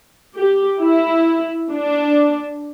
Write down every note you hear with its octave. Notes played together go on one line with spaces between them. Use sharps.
G4
E4
D4